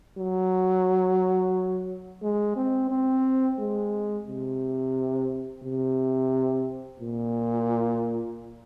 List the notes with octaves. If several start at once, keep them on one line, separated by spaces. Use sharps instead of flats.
F#3
G#3
C4
C4
G#3
C3
C3
A#2